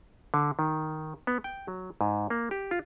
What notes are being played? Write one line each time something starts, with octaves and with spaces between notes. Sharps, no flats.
D3
D#3
B3
G5
F#3
G#2
A#3
G4
F4